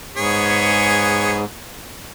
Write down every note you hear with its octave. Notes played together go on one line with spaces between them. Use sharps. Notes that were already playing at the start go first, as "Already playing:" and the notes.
G#2 B3 G#4 C#5